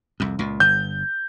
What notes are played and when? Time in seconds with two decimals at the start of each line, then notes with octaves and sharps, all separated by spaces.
0.20 C2 F2
0.39 C#2 A#2
0.60 G1 G2 G6